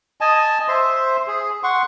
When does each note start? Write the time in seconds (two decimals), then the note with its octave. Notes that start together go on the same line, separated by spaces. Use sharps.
0.21 D#5 G#5 A5
0.68 C5 E5 C6
1.27 G#4
1.63 F#5 C6 C#6